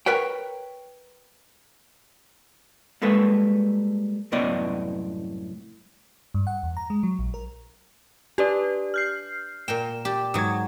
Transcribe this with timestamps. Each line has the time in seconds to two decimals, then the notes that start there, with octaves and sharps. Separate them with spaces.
0.06 A#4 B4 C#5 G5
3.02 G3 G#3 A#3 A4 B4
4.32 C2 F#2 A2 B3 D5 D#5
6.34 G2
6.47 F#5
6.63 E2
6.77 A#5
6.90 G#3
7.03 F#3
7.19 A#1
7.34 A#4
8.38 D4 G4 B4 D5
8.94 F6 G6 C7
9.68 A#2 A#4 G5 E7
10.05 G4 D5
10.34 G#2 F#3 D#6 G#6